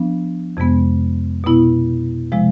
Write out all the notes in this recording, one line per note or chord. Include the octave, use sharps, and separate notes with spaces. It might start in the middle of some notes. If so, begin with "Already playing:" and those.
Already playing: F3 B3 D4
F2 C3 G#3 B3
B2 B3 E4
C3 F3 G#3